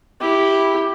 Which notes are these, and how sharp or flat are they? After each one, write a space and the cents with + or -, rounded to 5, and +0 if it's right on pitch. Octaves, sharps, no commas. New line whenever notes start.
E4 -5 G4 +0